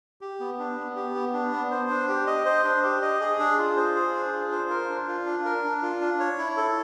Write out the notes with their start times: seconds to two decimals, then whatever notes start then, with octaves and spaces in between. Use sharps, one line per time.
0.21 G4
0.40 B3
0.59 D4
0.78 B3
0.96 G4
1.15 B3
1.34 D4
1.52 B3
1.71 C5
1.90 D4
2.08 G4
2.27 D#5
2.45 C5
2.64 D4
2.84 G4
3.02 D#5
3.21 G#4
3.39 D4
3.58 F4
3.77 C5
3.95 G#4
4.14 D4
4.33 F4
4.51 C5
4.70 A#4
4.89 D4
5.08 F4
5.26 D4
5.45 A#4
5.64 D4
5.82 F4
6.01 D4
6.20 C#5
6.38 E4
6.57 A4